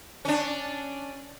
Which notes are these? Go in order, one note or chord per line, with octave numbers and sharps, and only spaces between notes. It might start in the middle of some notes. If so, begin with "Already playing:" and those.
C#4 D4